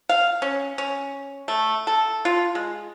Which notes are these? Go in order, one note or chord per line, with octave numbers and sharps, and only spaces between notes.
F5
C#4
C#4
A3
A4
F4
G#3